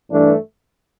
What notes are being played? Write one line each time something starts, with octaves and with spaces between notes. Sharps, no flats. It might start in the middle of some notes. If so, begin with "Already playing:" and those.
G2 E3 A3 D4